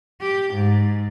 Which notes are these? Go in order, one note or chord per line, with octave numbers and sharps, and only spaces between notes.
G4
G#2